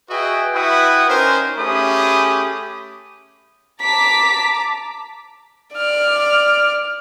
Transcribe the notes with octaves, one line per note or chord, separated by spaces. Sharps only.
F#4 G#4 B4 D#5 E5 G5
E4 F#4 B4 F#5 G5 D#6
C#4 D#4 A#4 C5
A3 C#4 G4 G#4 B5 D#6
A5 A#5 D6 B6
D5 F6